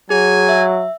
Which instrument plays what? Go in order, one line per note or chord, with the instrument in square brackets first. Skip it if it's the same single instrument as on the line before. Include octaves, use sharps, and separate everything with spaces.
[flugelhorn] F#3 [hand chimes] G#4 [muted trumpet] G#5
[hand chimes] E5